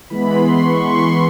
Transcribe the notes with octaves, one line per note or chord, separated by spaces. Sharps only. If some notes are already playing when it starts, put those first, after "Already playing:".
E3 G#3 B3 B5
C6
C#6
C#6
C6